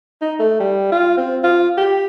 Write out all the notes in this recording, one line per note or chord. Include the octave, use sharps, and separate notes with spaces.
D#4
A3
G3
F4
C4
F4
G4